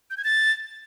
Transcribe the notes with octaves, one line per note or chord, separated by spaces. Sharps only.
G6
G#6
A6